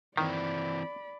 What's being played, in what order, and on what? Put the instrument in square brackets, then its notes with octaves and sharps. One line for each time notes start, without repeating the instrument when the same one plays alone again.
[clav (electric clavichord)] D#3 [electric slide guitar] E3 C4 [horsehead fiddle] D5 B5